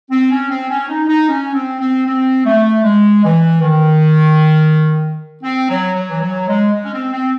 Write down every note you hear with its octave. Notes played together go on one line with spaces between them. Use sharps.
C4
C#4
C4
C#4
D#4
D#4
C#4
C4
C4
C4
A3
G#3
E3
D#3
C4
F#3
F#3
E3
F#3
G#3
G#3
C#4
C4
C4